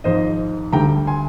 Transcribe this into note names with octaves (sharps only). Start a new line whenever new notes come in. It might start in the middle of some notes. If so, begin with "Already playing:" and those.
G#1 G#2 F3 C5 D#5
D2 D3 G3 G5 A#5
G#5 C6